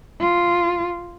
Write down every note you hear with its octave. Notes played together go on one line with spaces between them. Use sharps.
F4